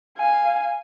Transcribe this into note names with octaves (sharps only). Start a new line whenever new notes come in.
F5 G#5